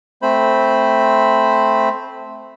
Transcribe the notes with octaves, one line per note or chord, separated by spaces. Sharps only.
A3 C4 C5 B5